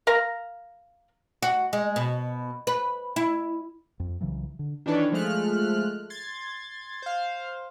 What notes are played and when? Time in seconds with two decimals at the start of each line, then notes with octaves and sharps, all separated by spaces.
0.07 A#4 F5 A#5
1.43 F#4
1.73 G#3
1.96 B2
2.67 B4
3.16 E4
4.00 F2
4.21 C2 C#3 E3 F#3
4.59 D3
4.86 D#3 E3 D4 A4 B4 C#5
5.12 F3 G#3 A3 F6 F#6
6.10 C6 G#6 A6
7.02 C5 F5